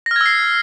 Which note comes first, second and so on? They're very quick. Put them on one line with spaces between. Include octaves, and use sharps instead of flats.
A#6 F6 G#6 E6 C7